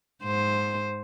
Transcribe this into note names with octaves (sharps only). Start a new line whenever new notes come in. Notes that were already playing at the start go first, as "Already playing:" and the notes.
G#2 C5